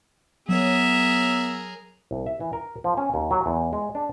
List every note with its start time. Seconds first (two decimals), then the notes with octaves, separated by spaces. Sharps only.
0.49 F#3 B3 G#4 A#4 C#5 E5
2.11 C2
2.26 E5
2.40 E3
2.53 A#4
2.84 F3
2.97 C#4
3.14 D#2
3.31 F#3
3.46 E2
3.73 G#3
3.95 D4